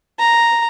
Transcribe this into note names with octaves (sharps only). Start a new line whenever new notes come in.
A#5